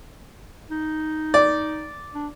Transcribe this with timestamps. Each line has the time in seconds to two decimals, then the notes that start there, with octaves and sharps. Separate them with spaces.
0.70 D#4
1.34 D5
2.15 D4